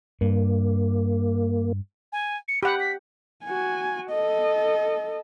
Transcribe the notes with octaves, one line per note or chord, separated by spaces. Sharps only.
G2 A#3
G#5
C#7
G4 F#5 B5
B6
F#4 G#5
A4 D#5